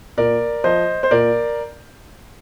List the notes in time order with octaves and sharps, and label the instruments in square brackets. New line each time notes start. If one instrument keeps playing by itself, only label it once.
[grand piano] A#2 A#4 D5
F3 C5 D#5
C5
A#2 A#4 D5